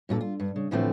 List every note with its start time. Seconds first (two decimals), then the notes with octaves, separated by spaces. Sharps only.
0.09 G2 A#2 F4 A4
0.21 F4
0.40 G2
0.56 C#3
0.71 A2 D3 E3 F3 A3 C4